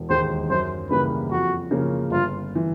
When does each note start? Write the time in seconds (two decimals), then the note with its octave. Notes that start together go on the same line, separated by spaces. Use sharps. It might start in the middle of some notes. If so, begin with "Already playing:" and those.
Already playing: E1
0.09 D#2 D#3 G#3 C5
0.50 F#2 C5
0.90 C#3 E3 G3 A#3 B4
1.31 F2 F#4
1.71 C#3 F3 A#3 C#4
2.11 G1 F4
2.55 E3